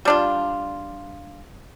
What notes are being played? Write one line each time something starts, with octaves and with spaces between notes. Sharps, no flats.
G3 D4 F4